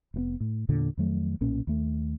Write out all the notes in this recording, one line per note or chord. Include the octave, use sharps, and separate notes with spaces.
F1 A2 B3
A2
E2 A#2 D3
F2 D#3 F#3 A3
B1 A#2 C#4
D#2 A3